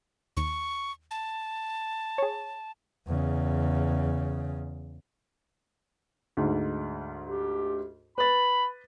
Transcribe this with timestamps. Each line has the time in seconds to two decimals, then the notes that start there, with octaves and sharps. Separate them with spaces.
0.37 D#2 C#6
1.11 A5
2.18 G#4 C#5
3.07 E2 C#3
6.37 D2 G#2
7.24 G4
8.18 B4 B5 A6